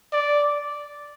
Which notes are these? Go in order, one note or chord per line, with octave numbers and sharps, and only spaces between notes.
D5